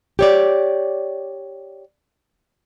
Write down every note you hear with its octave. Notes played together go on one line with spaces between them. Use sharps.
G4 C#5 D5